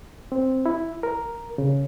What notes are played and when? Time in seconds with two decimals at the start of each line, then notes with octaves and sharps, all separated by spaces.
0.32 C4
0.66 E4
1.03 A#4
1.58 C#3